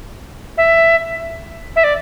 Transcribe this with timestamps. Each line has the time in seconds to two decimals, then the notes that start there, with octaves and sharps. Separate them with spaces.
0.58 E5
1.76 E5
1.84 D5